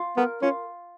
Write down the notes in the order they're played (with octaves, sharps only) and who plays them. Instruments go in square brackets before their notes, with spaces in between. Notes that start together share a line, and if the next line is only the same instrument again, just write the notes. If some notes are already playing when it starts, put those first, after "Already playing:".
Already playing: [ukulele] F4
[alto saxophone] B3 [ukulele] A#4
[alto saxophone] C#4 [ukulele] F4